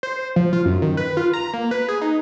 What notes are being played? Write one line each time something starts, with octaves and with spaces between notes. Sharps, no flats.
C5
F3
F4
F#2
D#3
B4
F4
A#5
A#3
B4
G#4
D#4